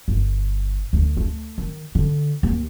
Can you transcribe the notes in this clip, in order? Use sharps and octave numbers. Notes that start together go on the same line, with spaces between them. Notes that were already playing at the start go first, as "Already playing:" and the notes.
G1
D2
A3
D#3
D3
D#2